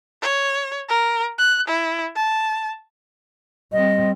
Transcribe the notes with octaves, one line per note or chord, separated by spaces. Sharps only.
C#5
A#4
F#6
E4
A5
G3 C4 D#5